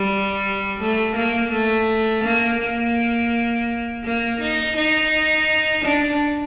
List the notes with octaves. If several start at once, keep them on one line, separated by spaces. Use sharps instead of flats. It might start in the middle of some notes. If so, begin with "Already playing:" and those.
Already playing: G3
A3
A#3
A3
A#3
A#3
A#3
D#4
D#4
D4